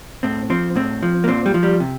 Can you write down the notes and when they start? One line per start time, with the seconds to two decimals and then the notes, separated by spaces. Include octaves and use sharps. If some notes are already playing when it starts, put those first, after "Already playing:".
0.23 A2 C4
0.50 F3 C4
0.75 A2 C4
1.03 F3
1.24 A#3
1.28 A#2 C4
1.46 G3
1.54 F3
1.63 G3
1.80 C3